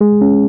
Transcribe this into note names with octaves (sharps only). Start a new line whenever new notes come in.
G#3 G#4
C#4